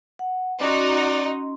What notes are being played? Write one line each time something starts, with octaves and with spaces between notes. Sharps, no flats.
F#5
C#4 D#4 F#4 D5 C6